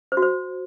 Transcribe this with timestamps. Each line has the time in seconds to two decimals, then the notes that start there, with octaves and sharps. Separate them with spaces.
0.12 C5
0.17 F#4
0.22 C5